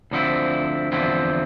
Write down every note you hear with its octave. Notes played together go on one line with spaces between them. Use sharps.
D2 D3 F3 C4 E4
E2 D3 F3 C4 E4